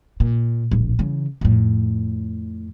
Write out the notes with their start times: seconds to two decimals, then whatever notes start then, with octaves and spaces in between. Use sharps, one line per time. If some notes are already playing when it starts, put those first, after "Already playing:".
0.20 A#2
0.71 D1 A#1
0.99 C#3 E3
1.41 F2 A2